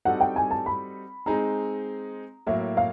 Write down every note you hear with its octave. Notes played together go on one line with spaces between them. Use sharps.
G3 C4 D#4 F#4 A4 F#5
G5
G#5
A5
B5
G#3 C4 D#4 G#4 A#5
A2 F#3 A#3 E5
F5